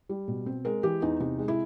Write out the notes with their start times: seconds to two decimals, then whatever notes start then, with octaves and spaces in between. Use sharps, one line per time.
0.09 G3
0.28 B2
0.46 C4
0.65 G#3 A#4
0.83 E3 G4
1.02 E2 D#4
1.20 C3 D#4
1.39 G#3
1.48 E4